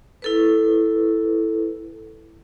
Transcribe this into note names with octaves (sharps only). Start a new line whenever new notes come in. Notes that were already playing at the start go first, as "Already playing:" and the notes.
E4 A4 B4